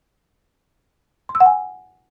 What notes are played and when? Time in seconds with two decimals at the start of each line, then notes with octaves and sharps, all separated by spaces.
1.29 C6
1.35 E6
1.40 F#5
1.46 G#5